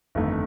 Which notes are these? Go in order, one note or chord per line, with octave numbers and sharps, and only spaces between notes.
G1 F2 D#3 A3 D#4